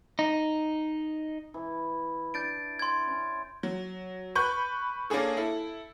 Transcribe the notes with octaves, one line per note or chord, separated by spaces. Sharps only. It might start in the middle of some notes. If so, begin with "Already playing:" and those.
D#4
E3 E4
D4 G6 A6 D7
C6 G#6
C#4
F#3
B4 B5 C#6 F#6 G6
A#3 C#4 D4 G#4 A4
E4 A4